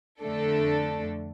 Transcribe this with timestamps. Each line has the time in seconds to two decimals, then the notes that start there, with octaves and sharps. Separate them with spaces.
0.22 F2 D3 A3 D4 A4